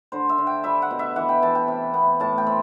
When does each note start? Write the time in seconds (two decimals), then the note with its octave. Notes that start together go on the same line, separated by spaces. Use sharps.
0.12 D3 C5
0.29 E5
0.38 D3
0.47 G5
0.64 G3 E5
0.82 F#5
0.91 B2
0.99 E5
1.16 E3 F#5
1.29 G5
1.42 E3 A5
1.55 G5
1.68 C3
1.94 B3
2.20 A2 A5
2.38 G5
2.47 C4